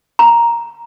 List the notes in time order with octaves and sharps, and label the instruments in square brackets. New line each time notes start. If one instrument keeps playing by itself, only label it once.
[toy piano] A#5